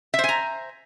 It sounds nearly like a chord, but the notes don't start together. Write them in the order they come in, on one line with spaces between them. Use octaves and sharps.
E5 C5 G#5 A#5